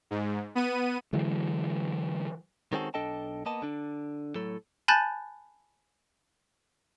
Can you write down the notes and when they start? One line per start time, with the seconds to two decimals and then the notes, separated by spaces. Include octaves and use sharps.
0.11 G#2
0.55 B3 D#7
1.13 D3 E3 F#3 G#3
2.73 D#3 G#3 C4 C#4 F#4 A4
2.94 B1 D4 A4 D#5 G5 A5
3.46 A#3 B3 D#5 A5
3.62 D3 D4
4.35 A2 F#3 A4
4.88 G#5 A5 B5 F#6 G6 A6